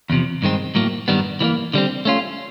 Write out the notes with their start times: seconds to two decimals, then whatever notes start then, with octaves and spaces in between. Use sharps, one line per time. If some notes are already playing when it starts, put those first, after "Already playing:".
0.10 E2 C3 F3
0.42 G2 D#3 G#3 C4
0.75 A2 F#3 A#3
1.08 G2 D#3 G3 B3
1.40 E3 G3 A#3
1.74 D3 G3 C4
2.05 A3 C#4 F4